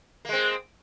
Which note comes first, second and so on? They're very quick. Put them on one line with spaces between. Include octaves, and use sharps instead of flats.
A#3 G#3 C4